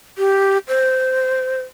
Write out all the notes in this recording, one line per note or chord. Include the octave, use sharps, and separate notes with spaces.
G4
C5